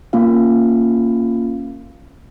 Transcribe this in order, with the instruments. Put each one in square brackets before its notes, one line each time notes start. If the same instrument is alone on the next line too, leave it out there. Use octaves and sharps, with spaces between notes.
[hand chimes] A#3 C#4 F4 F5